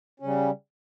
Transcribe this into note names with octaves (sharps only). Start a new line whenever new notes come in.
C#3 G3 C#4